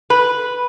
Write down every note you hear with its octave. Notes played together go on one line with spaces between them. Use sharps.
B4